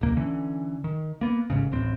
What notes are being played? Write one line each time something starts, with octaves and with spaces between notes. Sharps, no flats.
D#1 C2 A#3
D3 E3 C#4
D#3
A#3 B3
A1 G#2 C#3
D1 A1 C4